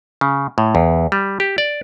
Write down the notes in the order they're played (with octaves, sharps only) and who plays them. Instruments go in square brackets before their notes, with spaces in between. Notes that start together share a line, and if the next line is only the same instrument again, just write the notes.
[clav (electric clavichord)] C#3
A2
E2
G3
G4
D5